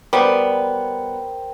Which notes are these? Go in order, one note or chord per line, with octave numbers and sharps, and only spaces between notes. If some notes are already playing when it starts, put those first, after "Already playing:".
G3 B3 A#4 C5 G5